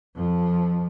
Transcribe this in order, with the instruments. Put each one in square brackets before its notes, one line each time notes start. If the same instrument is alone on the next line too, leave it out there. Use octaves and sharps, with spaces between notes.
[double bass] F2 F3